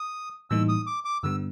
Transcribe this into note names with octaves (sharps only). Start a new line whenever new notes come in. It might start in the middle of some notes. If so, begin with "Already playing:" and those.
Already playing: D#6
A2 E3 G3 A#3 D#4 E6
D#6
D6
D6
G2 D3 G3 B3 E6